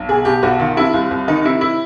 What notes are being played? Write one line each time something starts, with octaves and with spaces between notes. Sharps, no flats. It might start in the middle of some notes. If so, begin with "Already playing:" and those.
Already playing: B1
B2 G#4
B2 G4
B1 F#4
D#3 F4
C3 E4
C2 F4
C2
D#3 D#4
C3 E4
E4